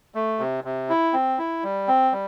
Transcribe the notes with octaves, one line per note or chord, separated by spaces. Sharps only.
A3
C3
C3
E4
C4
E4
G3
C4
G3